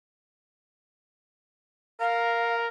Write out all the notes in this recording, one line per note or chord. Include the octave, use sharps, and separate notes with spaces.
A#4 F5